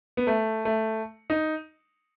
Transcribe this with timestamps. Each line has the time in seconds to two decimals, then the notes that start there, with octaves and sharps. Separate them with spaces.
0.17 B3
0.27 A3
0.65 A3
1.30 D#4